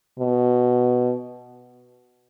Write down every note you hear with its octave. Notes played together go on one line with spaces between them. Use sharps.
B2